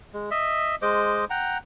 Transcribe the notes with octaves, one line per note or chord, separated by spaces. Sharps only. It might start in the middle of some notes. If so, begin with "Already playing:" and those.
G#3
D#5 E5
G#3 C5 D#5 D6
F#5 G5 A#5